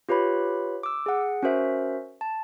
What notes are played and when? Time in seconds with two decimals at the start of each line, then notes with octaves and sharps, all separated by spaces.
0.09 F4 G4 B4 C#5 B5
0.83 D6 E6
1.06 G#4 F#5
1.43 C#4 F#4 A#4 C5 E5
2.21 A5